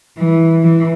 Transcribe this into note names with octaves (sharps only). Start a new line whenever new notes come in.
E3
E3